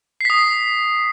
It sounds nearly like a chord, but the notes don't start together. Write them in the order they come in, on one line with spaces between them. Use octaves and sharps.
C7 B6 D#6